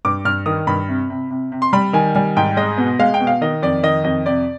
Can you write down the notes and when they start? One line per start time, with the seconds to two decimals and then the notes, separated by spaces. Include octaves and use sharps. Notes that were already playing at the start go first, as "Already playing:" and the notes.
0.05 G2 D6
0.25 G2 F6
0.46 D#3 D#6
0.67 G2 B5
0.89 C3
1.10 C3
1.31 C3
1.52 C3
1.62 C6
1.73 G3 B5
1.93 D#3 G#5
2.15 G3 G#5
2.37 G#2 G5
2.57 G#3 D#5
2.78 B2
2.99 G#3 F5
3.14 G5
3.20 B2
3.27 F5
3.41 D#3 D#5
3.63 F2 D5
3.83 D#3 D#5
4.04 F2 D#5
4.26 C3 D5